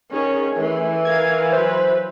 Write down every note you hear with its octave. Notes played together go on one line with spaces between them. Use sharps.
D#3 C#4 G#4 C#5
E3 A3
A#4 F5 G#6
F#3 B4 C5